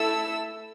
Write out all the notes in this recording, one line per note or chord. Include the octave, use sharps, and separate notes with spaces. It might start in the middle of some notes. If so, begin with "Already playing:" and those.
Already playing: A3 E4 A4 E6